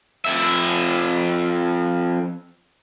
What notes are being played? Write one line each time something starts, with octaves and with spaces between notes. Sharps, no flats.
F2 E5